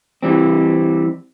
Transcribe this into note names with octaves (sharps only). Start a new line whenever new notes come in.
E3 G3 C4